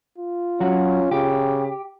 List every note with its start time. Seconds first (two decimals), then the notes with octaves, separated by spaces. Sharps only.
0.18 F4
0.60 F#3 C#4 F#4
1.11 C#3 G4